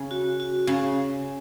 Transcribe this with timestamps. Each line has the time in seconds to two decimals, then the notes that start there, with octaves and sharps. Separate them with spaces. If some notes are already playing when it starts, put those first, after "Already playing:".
Already playing: C#3
0.11 F#4
0.40 F#4
0.67 C#3 C#4